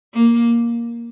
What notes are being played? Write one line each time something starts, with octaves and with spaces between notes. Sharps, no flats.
A#3